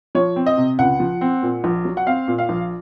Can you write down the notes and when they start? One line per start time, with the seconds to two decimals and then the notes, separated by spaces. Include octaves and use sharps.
0.15 F3 C#5
0.36 C4
0.46 D#5
0.57 C3
0.78 C#2 F#5
1.00 F3
1.21 C4
1.43 A#2
1.64 A#1
1.85 F#3
1.97 F#5
2.06 C4 F5
2.28 A#2
2.38 F5
2.49 A#1